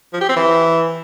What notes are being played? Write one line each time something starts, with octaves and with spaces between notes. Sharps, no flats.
F3
G4
C4
E3